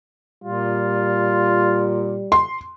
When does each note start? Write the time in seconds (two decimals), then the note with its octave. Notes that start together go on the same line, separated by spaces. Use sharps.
0.44 A#2 G3 F4
2.32 C6